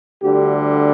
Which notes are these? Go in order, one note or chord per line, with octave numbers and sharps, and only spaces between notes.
D2 D3 G3 G4